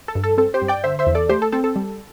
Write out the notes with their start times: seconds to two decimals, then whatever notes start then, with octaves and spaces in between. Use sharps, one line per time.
0.08 A4
0.15 G2
0.24 A4
0.38 C4 A4
0.54 G4 C5
0.62 G2
0.68 D5 G5
0.84 D3 C5 E5
0.99 C5 E5
1.07 E2
1.15 A4 D5
1.29 A3 G4 C5
1.42 A4
1.52 C4 A4
1.64 A4
1.76 G3